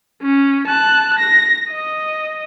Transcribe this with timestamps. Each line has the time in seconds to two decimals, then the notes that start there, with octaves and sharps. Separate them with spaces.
0.22 C#4
0.67 A5 F#6
1.18 A#6
1.71 D#5